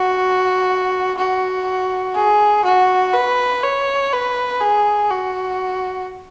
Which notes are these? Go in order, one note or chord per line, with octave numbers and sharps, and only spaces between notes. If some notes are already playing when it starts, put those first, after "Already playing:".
Already playing: F#4
F#4
G#4
F#4
B4
C#5
B4
G#4
F#4